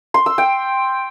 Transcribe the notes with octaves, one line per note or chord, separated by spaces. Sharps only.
C6
E6
G5